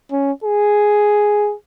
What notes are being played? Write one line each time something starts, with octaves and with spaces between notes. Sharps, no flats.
C#4
G#4